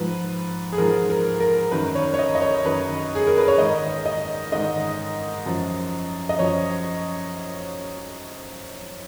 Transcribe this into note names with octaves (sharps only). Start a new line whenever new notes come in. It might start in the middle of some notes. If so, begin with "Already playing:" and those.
Already playing: G#2 F3 B4
G#4
G#2 F3 A#4
A#4
A#4
F#2 D#3 B4
C#5
C#5
D#5
D#5
C#5
F#2 D#3 B4
G#4
A#4
B4
C#5
G#2 D#3 D#5
D#5
G#2 D#3 D#5
F#2 F3
D#5
F#2 F3 C#5